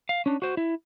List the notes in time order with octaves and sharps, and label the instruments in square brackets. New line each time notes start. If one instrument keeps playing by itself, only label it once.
[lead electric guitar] F5
C#4 D4
F#4 C5
E4